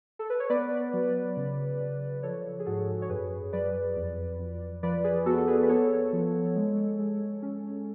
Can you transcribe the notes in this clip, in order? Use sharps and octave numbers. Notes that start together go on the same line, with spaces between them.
A4
B4
C#5
B3 B4 D5
F#3
C#3
C#3
F3 A4 C#5
G#4
G#2 F#4 A4
C#5
F#2 G#4 B4
F#3 B4 D5
F2
F2
F3 B4 D5
G#4 B4
B3 F#4 A4
A4
G#4 B4
B4
B3 A4 C#5
F3
G#3
G#3
C#4